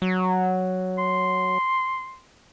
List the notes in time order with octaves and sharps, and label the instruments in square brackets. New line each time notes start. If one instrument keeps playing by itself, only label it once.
[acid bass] F#3
[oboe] C6